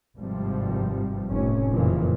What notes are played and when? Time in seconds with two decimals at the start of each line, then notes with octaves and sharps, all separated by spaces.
0.17 G#1 G2 C3 F3 G3
1.29 F1 A2 C3 C#4
1.70 F#1 F2 A#2 C#3 E3 F3